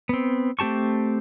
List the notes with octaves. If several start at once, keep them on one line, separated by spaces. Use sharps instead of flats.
B3 C4
A3 C4 G4 A5 C#6